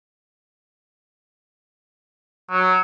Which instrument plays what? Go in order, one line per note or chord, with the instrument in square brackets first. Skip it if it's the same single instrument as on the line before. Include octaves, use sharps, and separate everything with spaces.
[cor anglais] F#3